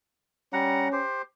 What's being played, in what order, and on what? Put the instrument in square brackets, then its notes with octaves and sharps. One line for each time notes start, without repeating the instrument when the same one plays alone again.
[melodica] G3 F#5 A#5 [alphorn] C#4
[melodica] G4 C5